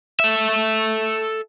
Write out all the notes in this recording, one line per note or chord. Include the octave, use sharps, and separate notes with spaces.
A4 E5